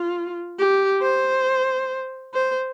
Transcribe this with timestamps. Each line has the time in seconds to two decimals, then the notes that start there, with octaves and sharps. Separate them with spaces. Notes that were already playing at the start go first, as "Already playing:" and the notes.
Already playing: F4
0.58 G4
1.02 C5
2.34 C5